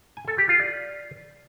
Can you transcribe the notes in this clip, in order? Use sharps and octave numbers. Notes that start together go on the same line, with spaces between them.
G#5
A4
G4
F4
D5